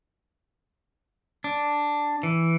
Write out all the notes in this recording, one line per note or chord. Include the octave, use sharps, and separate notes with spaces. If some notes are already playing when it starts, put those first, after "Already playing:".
D4
E3